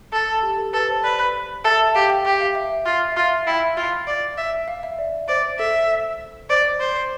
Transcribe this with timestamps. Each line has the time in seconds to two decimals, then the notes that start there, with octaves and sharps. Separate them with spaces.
0.13 A4
0.43 G4
0.58 A4
0.73 A4 B4
0.89 C5
1.04 B4 D5
1.64 A4 E5
1.95 G4 F5
2.10 G5
2.25 G4 G5
2.41 F5
2.55 E5
2.86 F4 F5
3.12 E5
3.17 F4 F5
3.47 E4 G5
3.77 F4 F5
4.07 D5
4.37 E5
4.68 F5
4.83 E5
4.99 D5
5.28 C5 D5
5.59 A4 E5
6.50 C5 D5
6.65 D5
6.80 C5